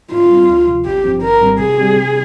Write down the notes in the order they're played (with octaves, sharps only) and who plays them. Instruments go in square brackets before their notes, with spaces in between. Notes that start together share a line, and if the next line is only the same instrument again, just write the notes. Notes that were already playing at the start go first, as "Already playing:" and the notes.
[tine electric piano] G#2 [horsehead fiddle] F4
[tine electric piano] G3 C4
D2
C3 F3
[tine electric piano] G#1 [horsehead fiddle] G4
[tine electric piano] G2 F3 C4
[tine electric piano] G#1 [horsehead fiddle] A#4
[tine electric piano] G#2 G3 C4
[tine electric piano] C3 [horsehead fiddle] G#4
[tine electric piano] G3 C4 G4
C3